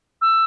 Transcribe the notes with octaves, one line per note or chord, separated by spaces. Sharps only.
E6